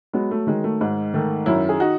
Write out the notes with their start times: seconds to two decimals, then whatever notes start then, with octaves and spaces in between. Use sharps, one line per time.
0.13 F#3 G#3 B3
0.31 A3
0.47 D#3 G#3
0.64 A3
0.81 G#2 G#3
1.14 D#3 A3
1.46 F#2 C#4 E4
1.69 G#4
1.80 D#4 F#4